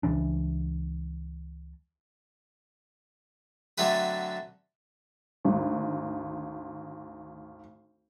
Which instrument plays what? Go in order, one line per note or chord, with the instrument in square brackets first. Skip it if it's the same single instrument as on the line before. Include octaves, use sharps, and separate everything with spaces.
[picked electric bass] C#2 E3 D4
[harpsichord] D3 F#3 A3 C4 B4
[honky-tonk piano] G#1 D2